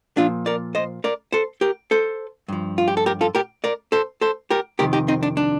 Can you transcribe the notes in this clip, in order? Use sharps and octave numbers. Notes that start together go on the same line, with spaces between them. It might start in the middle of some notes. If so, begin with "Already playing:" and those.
A#2 F3 D4 F4
A#4 D5
C5 D#5
A#4 D5
A4 C5
G4 A#4
A4 C5
G2 F3
F4
G4
A4
G4 A#4
F4 A4
G4 A#4
A#4 D5
A4 C5
A4 C5
G4 A#4
F2 C3 D#3 G4 A#4
D#4 G4
C4 D#4
D4
D4